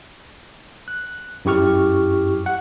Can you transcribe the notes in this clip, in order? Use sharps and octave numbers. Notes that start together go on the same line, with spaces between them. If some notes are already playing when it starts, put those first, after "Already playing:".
F#6
F#2 E4 G4 C#6 F6
F#5